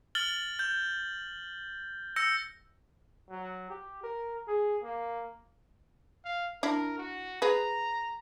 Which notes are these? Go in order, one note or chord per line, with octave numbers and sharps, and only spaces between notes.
F6 A6 F#7 G7
G6
E6 G6 A#6 C#7
F#3
G4
A#4
G#4
A#3
F5
D4 E4 A#4
F#4
G#4 B4 A#5